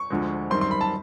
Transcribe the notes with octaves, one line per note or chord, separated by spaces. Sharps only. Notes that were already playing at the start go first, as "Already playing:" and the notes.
Already playing: C#6
D2 D3 F3 G#3
F#2 D#3 G3 C4 C6
C6
B5
A5